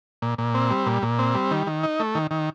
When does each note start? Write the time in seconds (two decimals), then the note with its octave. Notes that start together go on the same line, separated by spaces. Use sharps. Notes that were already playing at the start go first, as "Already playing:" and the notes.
0.22 A#2
0.38 A#2
0.55 C4
0.70 G3
0.86 A#2
1.02 A#2
1.19 C4
1.35 G3
1.51 D#3
1.67 D#3
1.83 D#4
2.00 A3
2.15 D#3
2.31 D#3